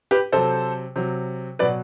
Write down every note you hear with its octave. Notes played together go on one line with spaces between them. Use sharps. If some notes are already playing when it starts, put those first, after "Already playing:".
G4 B4
C3 F#3 A4 C5
C3 F#3
B2 F#3 B4 D5